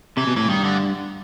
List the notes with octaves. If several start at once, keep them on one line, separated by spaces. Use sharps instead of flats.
C3 E3
B2
A2 E3
G2 D#3
D3